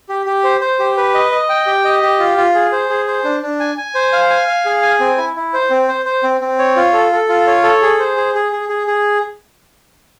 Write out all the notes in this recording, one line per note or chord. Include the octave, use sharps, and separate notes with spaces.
G4
G4
C5
C5
G4
B4
D#5
D#5
G5
G4
D#5
G4
F4
F4
G#4
C5
G#4
C5
D4
D4
G#5
G#5
C5
F5
G#5
F5
G#4
G#5
C4
E4
E4
C5
C4
C5
C5
C4
C4
C#5
F4
A4
A4
F4
C#5
A4
G#4
C5
G#4
G#4
G#4
G#4
G#4